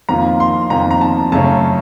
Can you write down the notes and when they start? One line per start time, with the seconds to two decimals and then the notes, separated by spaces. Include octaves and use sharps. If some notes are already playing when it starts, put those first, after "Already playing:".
0.09 F2 D#3 A#3 F4 A#5
0.40 C6
0.70 F2 D#3 A#3 F4 A#5
0.91 A#5
1.01 A5
1.32 F#2 C#3 A3 C#4 A5